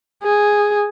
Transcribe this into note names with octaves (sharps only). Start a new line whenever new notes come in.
G#4